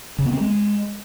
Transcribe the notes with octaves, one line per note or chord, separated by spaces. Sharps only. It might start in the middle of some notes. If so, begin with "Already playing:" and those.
C#3
B3
C4
G#3